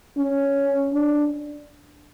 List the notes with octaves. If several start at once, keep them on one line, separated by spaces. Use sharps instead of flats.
C#4
D4